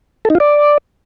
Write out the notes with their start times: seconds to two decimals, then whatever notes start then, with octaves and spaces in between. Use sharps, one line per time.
0.25 A4
0.30 D#4
0.35 F4
0.40 D5